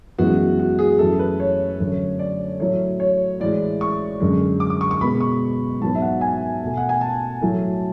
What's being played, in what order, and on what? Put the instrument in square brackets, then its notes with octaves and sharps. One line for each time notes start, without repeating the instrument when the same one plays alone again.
[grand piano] F#2 E3 G#3 B3 F#4
F#4
G#4
F#2 E3 A3 A4
B4
C#5
F#2 D3 A3
D5
A2 F#3 A3 C#5
C#5
A2 E3 G#3 D5
C#6
F#2 D3 G#3
D6
D6
C#6
C#6
B2 G#3 B3 B5
C#6
G#2 F#3 B3 A5
E5
F#5
G#5
B2 A3
F#5
G#5
A5
A2 F#3 A3